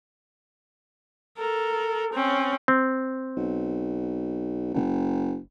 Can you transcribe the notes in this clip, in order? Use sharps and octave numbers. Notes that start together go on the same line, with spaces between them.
A4 A#4
C4 C#4
C4
B1
F#1